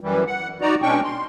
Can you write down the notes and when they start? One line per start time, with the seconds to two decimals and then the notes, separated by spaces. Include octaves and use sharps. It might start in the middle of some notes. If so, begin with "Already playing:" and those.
0.01 F#2 E3 G3
0.27 F#5
0.61 D#4 F#4 D5 A#5
0.82 B2 G#3 C#4 D4 G5 C#6
1.04 C6